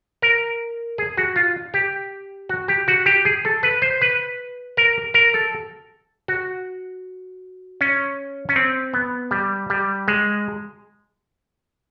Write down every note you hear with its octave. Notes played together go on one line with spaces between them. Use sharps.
A#4
G#4
F#4
F4
G4
F#4
G4
F#4
G4
G#4
A4
B4
C5
B4
A#4
A#4
A4
F#4
C#4
C#4
C4
B3
G3
G3
G#3